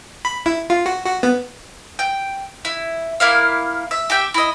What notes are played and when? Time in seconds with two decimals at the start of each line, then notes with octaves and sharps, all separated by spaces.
0.25 B5
0.46 E4
0.70 F4
0.86 F#4
1.06 F#4
1.23 B3
1.99 G5
2.65 E4
3.20 A#3 E4 F5
3.91 E5
4.10 G4 E5 G5
4.34 E4 D#5